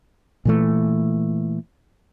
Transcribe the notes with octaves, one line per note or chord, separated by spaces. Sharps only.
A#2 E3 A3